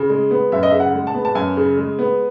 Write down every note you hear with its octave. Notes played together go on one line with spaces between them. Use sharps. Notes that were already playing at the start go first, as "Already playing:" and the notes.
Already playing: C#3
G#3
B3
F#2 E5
D#5
C#3 E5
F#5
G#3
A5
B3
A5
F#2 G#5
C#3
G#3
B3